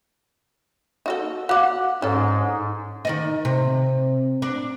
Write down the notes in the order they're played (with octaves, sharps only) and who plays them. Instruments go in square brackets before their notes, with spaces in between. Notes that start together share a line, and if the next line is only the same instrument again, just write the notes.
[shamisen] D#4 F#4 A4
[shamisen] F#4 F#5 [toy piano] F5 D6
[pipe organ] G#2 [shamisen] C#4 A4
[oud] D#3 D5 D#5
C3
D4